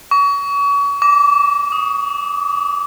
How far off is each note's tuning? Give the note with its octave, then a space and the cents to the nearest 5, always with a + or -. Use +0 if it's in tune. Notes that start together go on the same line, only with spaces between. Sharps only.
C#6 +35
D6 -25
D#6 +5